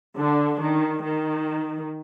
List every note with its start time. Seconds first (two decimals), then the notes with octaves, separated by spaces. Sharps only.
0.17 D3 D4
0.60 D#3
1.04 D#3